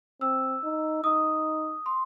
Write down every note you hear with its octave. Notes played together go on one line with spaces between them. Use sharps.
C4 E6
D#4
D#4 D#6
C6